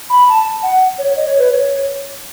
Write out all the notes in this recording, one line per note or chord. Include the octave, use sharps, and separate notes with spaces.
B5
A5
F#5
C#5
D#5
C#5
B4
C#5